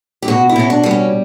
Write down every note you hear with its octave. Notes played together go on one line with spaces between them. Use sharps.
G4
B2 F#4
E4
B2 C#4
D4
G3 B3
C#4